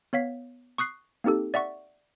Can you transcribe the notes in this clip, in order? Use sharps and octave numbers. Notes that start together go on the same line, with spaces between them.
B3 C#5 F5 B6
C#6 D#6 F#6 C7
A#3 C4 D#4 G4 A4
D5 E5 F#5 C#6